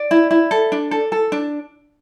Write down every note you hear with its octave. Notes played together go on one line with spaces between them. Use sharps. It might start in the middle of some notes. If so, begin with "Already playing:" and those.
Already playing: D5
E4
E4
A4
D4
A4
A4
D4